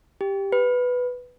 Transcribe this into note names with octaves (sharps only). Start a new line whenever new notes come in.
G4
B4